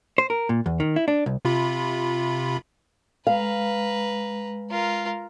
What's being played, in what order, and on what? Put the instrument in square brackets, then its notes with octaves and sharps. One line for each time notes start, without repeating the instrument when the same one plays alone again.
[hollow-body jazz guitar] C5
A#4
A#2
E2
D#3
E4
D4
C2
[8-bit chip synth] C3 F4 B5
[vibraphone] G#3 [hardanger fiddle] B4 A#5 [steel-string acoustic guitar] F5
[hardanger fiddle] F4 A#4